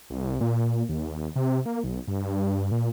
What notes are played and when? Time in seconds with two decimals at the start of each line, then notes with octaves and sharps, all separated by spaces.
0.10 C2
0.41 A#2
0.89 D#2
1.36 C3
1.66 A#3
1.84 B1
2.08 G2
2.71 A#2